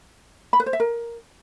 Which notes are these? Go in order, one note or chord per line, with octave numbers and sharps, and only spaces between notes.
B5
B4
C5
E5
A#4